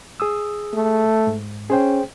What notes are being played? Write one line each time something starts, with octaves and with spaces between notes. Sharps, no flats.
G#4 D#6 E6
A3
G#2
C#4 G#4 C5 G5